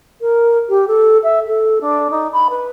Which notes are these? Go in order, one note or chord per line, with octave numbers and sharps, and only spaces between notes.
A#4
G4
A4
E5
A4
D4
D#4
B5
B4